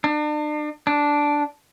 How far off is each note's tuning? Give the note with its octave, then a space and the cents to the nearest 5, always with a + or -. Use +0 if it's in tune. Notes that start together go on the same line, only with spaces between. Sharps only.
D4 +40
D4 -5